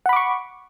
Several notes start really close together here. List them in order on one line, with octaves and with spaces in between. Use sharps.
F#5 B5 D6 C#6